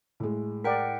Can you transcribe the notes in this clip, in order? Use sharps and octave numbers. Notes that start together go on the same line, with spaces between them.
A2 G#3
A#4 D5 F#5 G5 B6